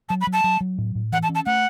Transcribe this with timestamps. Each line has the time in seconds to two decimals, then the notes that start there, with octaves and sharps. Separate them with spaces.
0.09 F#3 A5
0.21 B5
0.27 F#3
0.33 A5
0.44 F#3
0.61 F#3
0.78 A2
0.95 A2
1.12 E3 F#5
1.23 A5
1.29 C#4
1.35 A5
1.46 A3 F#5